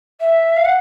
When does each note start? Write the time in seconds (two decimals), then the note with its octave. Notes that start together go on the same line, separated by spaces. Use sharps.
0.20 E5
0.56 F5
0.65 F#5